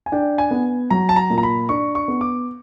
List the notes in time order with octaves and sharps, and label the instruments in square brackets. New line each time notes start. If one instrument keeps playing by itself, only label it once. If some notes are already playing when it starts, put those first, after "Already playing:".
[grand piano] G#5
[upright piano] D4 [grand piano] G5
[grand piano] G#5
[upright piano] B3
[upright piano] F#3 [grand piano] A#5
[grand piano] A5
A#5
[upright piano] A#2
[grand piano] A#5
B5
[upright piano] D4 [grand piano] C#6
[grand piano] C#6
[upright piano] B3
[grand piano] D6